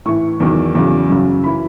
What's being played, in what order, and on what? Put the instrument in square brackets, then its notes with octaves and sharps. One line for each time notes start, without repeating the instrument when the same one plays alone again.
[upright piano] A2 E3 C#6
E2 D#3 F#3
E2 C#3 F#3
F#2 C#3 F#3
E3 B5